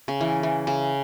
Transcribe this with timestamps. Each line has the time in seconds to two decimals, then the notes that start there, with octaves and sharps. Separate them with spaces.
0.08 C#3
0.21 E3
0.43 E3
0.67 C#3